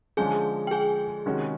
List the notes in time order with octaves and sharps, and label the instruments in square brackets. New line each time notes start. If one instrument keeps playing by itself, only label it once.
[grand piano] D3 F3 G#3 C#4 [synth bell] G#4 G#5
[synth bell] G5
G#4 G#5
[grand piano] C3 D#3 G#3 C#4 F#4